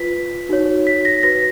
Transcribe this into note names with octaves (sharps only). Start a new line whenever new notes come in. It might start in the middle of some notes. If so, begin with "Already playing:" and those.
Already playing: F4 B4 B6
D#4 F#4 C#5
B6
A#6
F#4 B4 A#6